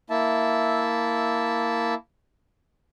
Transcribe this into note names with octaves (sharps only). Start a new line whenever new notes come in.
A#3 E4 E5 A5